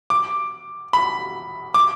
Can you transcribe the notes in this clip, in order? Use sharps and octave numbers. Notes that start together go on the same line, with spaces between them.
D6
B5
D6